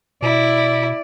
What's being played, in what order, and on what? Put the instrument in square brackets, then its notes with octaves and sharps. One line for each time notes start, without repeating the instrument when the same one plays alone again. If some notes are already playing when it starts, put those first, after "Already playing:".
[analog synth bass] B2 [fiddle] E4 [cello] D5